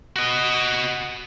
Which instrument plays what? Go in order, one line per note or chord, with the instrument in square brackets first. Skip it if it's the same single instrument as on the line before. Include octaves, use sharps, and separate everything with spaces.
[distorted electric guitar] F#4 D#5